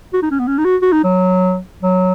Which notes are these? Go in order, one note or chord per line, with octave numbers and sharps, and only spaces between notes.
F#4
D#4
C#4
B3
C#4
D#4
F#4
F#4
D#4
F#3
F#3